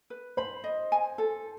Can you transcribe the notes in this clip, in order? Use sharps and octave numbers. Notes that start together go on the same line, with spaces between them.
B4
C5 B5
D#5
G#5
A4